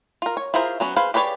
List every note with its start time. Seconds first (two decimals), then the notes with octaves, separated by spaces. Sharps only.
0.22 F4 A#4
0.37 C#5
0.54 E4 F4 G#4 A#4 C5
0.80 F#3 B3 C#4
0.96 G#4 B4 C5 F5
1.14 G4 G#4 B4 C#5 D5